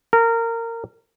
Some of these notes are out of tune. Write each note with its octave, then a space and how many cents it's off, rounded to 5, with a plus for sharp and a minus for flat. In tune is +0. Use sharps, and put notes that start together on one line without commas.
A#4 -20